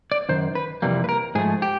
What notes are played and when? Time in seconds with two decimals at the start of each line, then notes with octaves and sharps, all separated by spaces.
0.12 D5
0.29 F#2 D#3 C5
0.55 B4
0.82 F2 C3 E3 G3 A#3
1.04 B4
1.09 A#4
1.35 G#2 F3 A3 G#4
1.62 G4